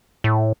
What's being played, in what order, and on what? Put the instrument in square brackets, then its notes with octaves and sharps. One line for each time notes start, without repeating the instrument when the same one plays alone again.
[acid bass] A2